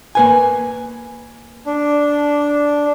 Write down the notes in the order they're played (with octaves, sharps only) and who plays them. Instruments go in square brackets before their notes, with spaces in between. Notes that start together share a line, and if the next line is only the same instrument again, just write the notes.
[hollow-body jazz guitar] A#3 B4 G#5
[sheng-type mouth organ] D4